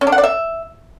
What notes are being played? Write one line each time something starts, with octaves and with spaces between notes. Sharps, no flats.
C#4
D4
F#5
D5
E5